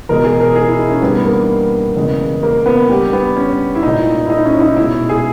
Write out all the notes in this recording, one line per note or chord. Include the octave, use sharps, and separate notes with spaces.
E2 B2 G#3 A#4
G#4
A#4
G#4
E4
D#4
C#4
G2 E3 G3 B3
A#3
E2 C#3 G#3
A#3
B3
G2 G3 G4
B3
C#4
E4
A#2 G#3 D#4
E4
D#4
C#4
E4
D#4
B2 G#3 E4
G#4